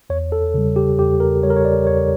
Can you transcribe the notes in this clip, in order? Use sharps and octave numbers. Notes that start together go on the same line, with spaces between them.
E2 C#5
A4
C#3 G3
G4
E2 G4
A#4
C#3 G3 C#5
A#4
C#5
D5
E2 C#5